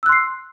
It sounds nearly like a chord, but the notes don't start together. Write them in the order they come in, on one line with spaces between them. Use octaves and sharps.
E6 F#6 C6 C7